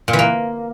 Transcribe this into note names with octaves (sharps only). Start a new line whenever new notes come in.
A#2
E3
A#3